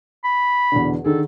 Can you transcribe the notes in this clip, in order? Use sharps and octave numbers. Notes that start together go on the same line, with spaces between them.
B5
E2 B2 D3
D3 D#3 G#4 A4